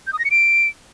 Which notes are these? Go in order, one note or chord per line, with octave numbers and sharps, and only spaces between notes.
G6
D#6
A#6
C#7
D7